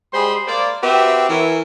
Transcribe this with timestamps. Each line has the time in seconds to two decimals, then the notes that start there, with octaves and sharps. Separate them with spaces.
0.13 G3 G#3 G#4 C5 B5 C6
0.47 A#3 C5 D5
0.83 C4 F#4 G4 B4 E5
1.29 E3 A#4 C#5